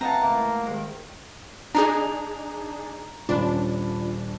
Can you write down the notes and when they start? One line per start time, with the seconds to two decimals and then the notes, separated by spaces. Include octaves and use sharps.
0.01 E3 C4 D#5 F5 F#5 A5 A#5
0.23 C#2 A2 A#3
0.66 D2 C3 D#3 G#3 A#4
1.75 D4 D#4 G#4 A#5
3.29 D#1 C#4 D4 F4 B5